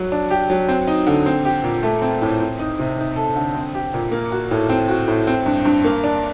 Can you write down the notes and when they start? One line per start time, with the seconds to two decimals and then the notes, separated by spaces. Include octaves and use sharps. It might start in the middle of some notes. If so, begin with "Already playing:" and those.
Already playing: F#3
0.12 D4
0.31 G4
0.50 F#3
0.69 C4
0.87 D#4
1.07 D3
1.26 C4
1.45 G4
1.64 A#2
1.83 A3
2.02 C4
2.22 A2
2.40 C4
2.59 D#4
2.79 C3
2.98 D#4
3.16 A4
3.36 D3
3.55 C4
3.75 G4
3.94 A#2
4.12 A#3
4.32 F#4
4.51 A2
4.69 C4
4.88 F#4
5.08 A2
5.27 C4
5.46 G2
5.65 G2
5.84 A#3
6.04 D4